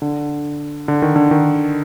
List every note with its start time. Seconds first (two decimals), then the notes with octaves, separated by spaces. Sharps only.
0.02 D3
0.88 D3
1.02 D#3
1.16 D3
1.31 D#3